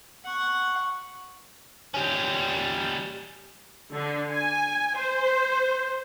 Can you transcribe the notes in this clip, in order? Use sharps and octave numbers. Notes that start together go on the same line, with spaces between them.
F#5 C#6
G3 C#4
D3
G#5
C5